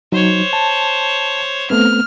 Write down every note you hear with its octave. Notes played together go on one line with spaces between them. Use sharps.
F#3 D#4 C5 C#5
A5
A3 B3 C4 F6